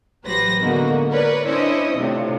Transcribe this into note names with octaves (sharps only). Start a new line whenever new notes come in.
A1 F#3 G4 B4 C5 A#6
D3 G#3 A#3 B3 D#4 F#4
A#4 B4 C#5 D5
C#4 D4 E4 C5 C#5 D#5
A2 C3 D4 F4